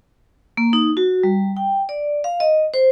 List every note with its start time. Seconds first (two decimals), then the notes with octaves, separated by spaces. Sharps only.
0.57 A#3
0.73 D#4
0.97 F#4
1.23 G3
1.57 G5
1.89 D5
2.24 F5
2.40 D#5
2.74 C5